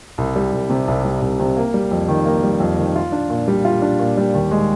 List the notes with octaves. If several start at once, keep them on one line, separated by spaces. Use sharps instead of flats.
C2
G3
C2
C3
C2
G3
C2
C3
A#3
G3
F2
D#3
A#3
G3
F2
D#3
F4
D4
A#2
G3
F4
D4
A#2
G3
D#2
G#3